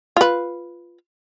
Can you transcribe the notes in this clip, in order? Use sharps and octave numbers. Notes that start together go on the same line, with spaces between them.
F4 B4